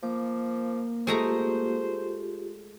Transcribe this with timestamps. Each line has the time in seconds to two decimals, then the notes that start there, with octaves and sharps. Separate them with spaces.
0.03 F3 A#3 D6
1.07 G#3 A3 F4 G4 C5 A#5